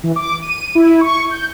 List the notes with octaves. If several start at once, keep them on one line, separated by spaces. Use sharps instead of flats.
E3
D6
D#7
E4
C#6
G6